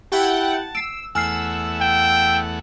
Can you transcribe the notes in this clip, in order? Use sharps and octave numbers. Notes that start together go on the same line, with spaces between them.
E4 G4 F#5 G5 A5
E6 C7 D7
E2 A3 F#5 G#5 E6 F6 C7
G5